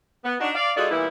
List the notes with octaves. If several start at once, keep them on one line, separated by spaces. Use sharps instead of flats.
B3
D4 D#4 F#4
D5 F5
G#3 D#4 F4 F#4 A4 D5
A#2 E3 G3 B3 E4